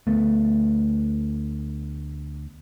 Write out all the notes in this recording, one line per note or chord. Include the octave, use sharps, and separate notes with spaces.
D2 A3 B3